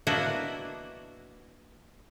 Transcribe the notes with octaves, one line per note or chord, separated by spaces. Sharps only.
A#3 B3 D4 E4 F#4 D#5